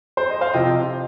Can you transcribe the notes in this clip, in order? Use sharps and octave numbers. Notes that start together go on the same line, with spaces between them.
C5
D#5
C5 F5
C3 F3 C4 D#5 G5